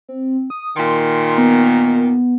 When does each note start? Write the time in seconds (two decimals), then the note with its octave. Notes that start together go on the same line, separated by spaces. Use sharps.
0.09 C4
0.50 D#6
0.77 A#2 D#3 C6
1.38 B3